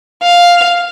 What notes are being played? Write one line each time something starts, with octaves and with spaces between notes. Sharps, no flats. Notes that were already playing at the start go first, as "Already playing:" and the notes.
F5